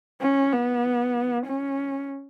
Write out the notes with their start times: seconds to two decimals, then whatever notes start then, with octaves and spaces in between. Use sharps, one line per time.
0.21 C#4
0.53 B3
1.46 C#4